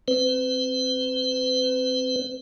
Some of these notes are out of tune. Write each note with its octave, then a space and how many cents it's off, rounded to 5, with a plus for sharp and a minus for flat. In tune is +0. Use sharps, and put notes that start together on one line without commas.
C4 +5 B4 +45